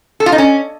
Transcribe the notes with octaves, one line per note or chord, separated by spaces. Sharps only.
A4
F4
D#4
C#4